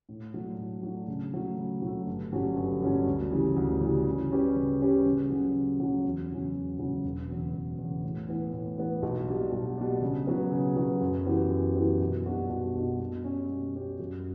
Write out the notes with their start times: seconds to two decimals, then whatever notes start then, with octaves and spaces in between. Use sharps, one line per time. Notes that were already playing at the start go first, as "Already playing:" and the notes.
0.09 A2
0.33 F#3 A3 D4
0.58 A2
0.83 F#3 A3 D4
1.08 C#3
1.33 F#3 A3
1.57 C#3
1.82 F#3 A3
2.07 G1
2.32 G2 F#3 C#4
2.57 G1
2.81 G2 F#3 C#4
3.07 D2
3.31 C#3 E3 G3
3.56 D2
3.81 C#3 E3 G3
4.06 C#3
4.30 G3 C#4 G4 B4
4.55 C#3
4.81 G3 C#4 G4 B4
5.06 C#3
5.30 F#3 C#4
5.55 C#3
5.80 F#3 C#4
6.04 E2
6.30 C#3 F#3 C#4
6.54 E2
6.79 C#3 F#3 C#4
7.04 E1
7.29 E2 C#3
7.54 E1
7.78 E2 C#3
8.03 A2
8.28 E3 B3
8.53 A2
8.78 E3 B3
9.03 B1
9.28 B2 G3 D4
9.53 B1
9.77 B2 G3 D4
10.02 C#3
10.27 F#3 B3
10.52 C#3
10.76 F#3 B3
11.01 F#2
11.26 E3 B3 E4 G4
11.51 F#2
11.76 E3 B3 E4 G4
12.00 B1
12.26 B2 G3 D4 F#4
12.50 B1
12.75 B2 G3 D4 F#4
13.00 B2
13.24 G3 C#4 G4 C#5
13.50 B2
13.75 G3 C#4 G4 C#5
14.00 F#2